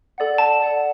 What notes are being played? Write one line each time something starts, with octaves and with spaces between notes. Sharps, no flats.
A4 D5 F#5
A5
A4 D5 F#5